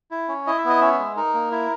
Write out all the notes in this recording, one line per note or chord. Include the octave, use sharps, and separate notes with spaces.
E4
C#4
E4 D#5
E5
B3
D#5
C#4 E5
G#3
D#4 A#4
A#3
E4